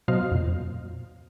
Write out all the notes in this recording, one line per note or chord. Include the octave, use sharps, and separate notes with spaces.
B2 F#3 C5 D#5 F5 F6
F2 A#2